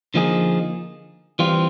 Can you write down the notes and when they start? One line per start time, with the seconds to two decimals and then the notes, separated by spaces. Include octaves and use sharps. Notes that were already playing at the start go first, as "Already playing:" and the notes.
0.14 D3 F3 A#3 D#4 G#4
1.39 E3 G3 C4 F4